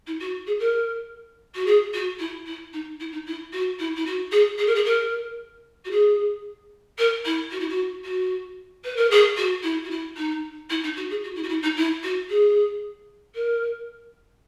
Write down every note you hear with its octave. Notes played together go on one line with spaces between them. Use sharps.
E4
F#4
G#4
A#4
F#4
G#4
F#4
E4
E4
D#4
E4
D#4
E4
F#4
E4
E4
F#4
G#4
G#4
A#4
G#4
A#4
F#4
G#4
A#4
E4
F#4
E4
F#4
F#4
B4
A#4
G#4
F#4
E4
F#4
E4
D#4
E4
D#4
F#4
G#4
F#4
E4
F#4
E4
D#4
E4
F#4
G#4
A#4